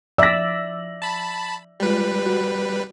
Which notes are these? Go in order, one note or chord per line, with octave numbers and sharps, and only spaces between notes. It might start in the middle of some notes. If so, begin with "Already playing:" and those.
F3 D5 E5 E6 A#6 F#7
A5 B5
G3 G#3 F4 B4
F#4